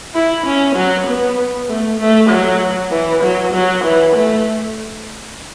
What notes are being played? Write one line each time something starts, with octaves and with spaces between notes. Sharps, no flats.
E4
C#4
F#3
B3
A3
A3
F#3
E3
F#3
F#3
E3
A3